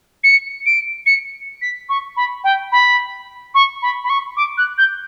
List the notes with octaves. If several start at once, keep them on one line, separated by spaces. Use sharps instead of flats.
C#7
D7
C#7
B6
C#6
B5
G5
B5
C#6
B5
B5
C#6
D6
F#6
G6